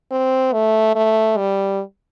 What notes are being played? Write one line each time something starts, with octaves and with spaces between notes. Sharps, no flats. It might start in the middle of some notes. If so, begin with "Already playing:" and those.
C4
A3
A3
G3